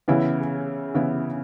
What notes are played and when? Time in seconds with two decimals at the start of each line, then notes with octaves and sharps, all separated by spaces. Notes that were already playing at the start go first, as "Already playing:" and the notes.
0.08 C#3 E3 B3 E4
0.94 C#3 E3 B3 E4